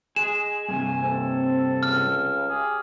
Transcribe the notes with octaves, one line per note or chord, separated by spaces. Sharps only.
G#3 G#4 E7
G2 C3 G#5
C4 A4
C#2 F6
G4 G#4